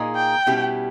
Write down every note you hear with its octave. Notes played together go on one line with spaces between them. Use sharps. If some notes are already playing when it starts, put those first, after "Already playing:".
Already playing: A#2 A#3 D#4 G#4
G5
B2 G3 C#4 E4 G4